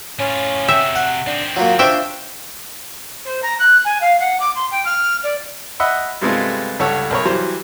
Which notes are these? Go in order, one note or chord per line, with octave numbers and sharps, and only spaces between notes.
A2 C#4 F4
C3 F#4 E5 G5
F#5
D#3 C4 D4
F#3 A#3 F4
D4 C5 C#5 E5 G5
C5
A#5
F#6
G#5
F5
F#5
D6
C6
G5
F6
D5
D#5 E5 F#5 B5 E6
G2 C3 G#3 A3 B3 F4
C#2 G2 A4 C#5 F#5
B1 A#4 C#5
E3 F#3 G3 C5